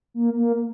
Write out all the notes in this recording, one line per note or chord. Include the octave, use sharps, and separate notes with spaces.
A#3
A#3